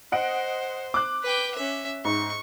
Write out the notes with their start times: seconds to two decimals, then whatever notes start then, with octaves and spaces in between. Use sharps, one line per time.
0.12 C5 D#5 F#5 D7
0.94 D6 F#6
1.23 B4 G5
1.55 C#4 E5
2.05 G#2 C#6